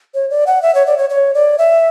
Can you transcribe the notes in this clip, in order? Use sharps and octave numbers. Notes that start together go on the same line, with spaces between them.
C#5
D5
F#5
E5
C#5
D5
C#5
C#5
D5
E5